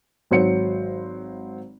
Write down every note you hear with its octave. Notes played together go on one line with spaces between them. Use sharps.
G#1 F#3 C5 C#7